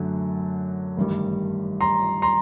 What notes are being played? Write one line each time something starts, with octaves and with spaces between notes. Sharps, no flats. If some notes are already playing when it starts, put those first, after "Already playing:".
Already playing: F#2 D3 F#3 A3
A1 G2 D#3 G3
A#5 C6
A#5 C6